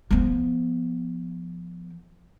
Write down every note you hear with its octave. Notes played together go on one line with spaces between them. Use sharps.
F3 B3